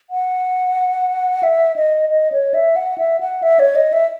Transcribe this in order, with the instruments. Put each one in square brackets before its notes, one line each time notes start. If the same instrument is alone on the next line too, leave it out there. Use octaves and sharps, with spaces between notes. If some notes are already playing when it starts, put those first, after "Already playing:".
[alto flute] F#5
E5
D#5
D#5
C#5
E5
F#5
E5
F#5
E5
C#5
D#5
E5